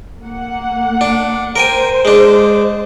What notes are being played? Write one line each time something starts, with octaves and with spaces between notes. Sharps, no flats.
A#3 F#5
D4
A#4 C5 G5 G#5
G#3 D4